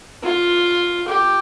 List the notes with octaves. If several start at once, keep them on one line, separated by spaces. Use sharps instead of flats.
F4
G4